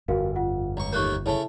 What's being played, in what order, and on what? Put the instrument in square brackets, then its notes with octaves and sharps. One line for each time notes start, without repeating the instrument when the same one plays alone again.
[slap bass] G1 F2 [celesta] F#4 A#4 F5
[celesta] F4 F#5
[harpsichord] C#2 C#6 [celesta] A#5
[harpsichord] D#2 A3 A#3 [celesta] C#6 F#6 G6
[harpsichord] C#3 A3 [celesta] E4 C#5 A5